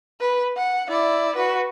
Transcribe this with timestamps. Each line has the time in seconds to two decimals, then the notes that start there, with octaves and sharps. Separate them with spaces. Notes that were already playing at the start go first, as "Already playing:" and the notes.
0.20 B4
0.57 F#5
0.89 E4 D5
1.35 F#4 B4